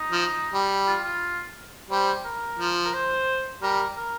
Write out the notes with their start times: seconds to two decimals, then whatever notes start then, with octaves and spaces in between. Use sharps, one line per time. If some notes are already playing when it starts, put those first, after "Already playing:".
Already playing: D#4
0.12 F3
0.53 G3
0.87 F4
1.04 F4
1.91 G3 C5
2.25 A#4
2.59 F3
2.85 A#4
2.93 C5
3.62 G3 A#4
3.97 A#4